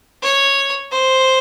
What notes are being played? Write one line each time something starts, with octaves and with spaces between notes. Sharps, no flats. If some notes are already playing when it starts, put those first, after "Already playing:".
C#5
C5